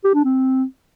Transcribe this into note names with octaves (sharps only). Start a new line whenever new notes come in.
G4
D4
C4